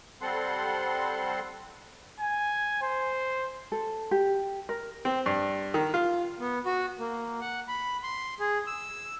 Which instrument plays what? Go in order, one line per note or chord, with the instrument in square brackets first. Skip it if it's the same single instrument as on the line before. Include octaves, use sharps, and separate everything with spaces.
[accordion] G3 C4 A4 F#5 C6
[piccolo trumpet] G#5
C5
[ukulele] A4
G4
A#4
[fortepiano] C4
G2
D#3
F4
[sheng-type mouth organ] B3
F#4
A#3
F#5
B5
C6
G#4
E6